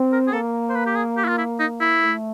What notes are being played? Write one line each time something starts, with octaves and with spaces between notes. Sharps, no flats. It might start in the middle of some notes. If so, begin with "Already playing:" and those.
Already playing: C4
A#4
G#4
A#3 A4
C5
B4
G4
G#4
G4
E4
F4
E4
D#4
E4
A3